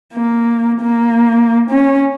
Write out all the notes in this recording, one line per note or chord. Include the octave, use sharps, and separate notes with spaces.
A#3
A#3
C#4